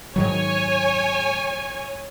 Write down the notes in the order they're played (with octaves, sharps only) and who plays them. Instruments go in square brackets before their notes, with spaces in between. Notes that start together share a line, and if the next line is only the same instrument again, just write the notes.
[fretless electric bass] G#2 D#3 F#3 [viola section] C#5 G#5